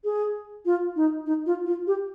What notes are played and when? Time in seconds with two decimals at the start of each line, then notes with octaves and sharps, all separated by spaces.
0.04 G#4
0.65 F4
0.96 D#4
1.26 D#4
1.46 F4
1.66 F4
1.87 G4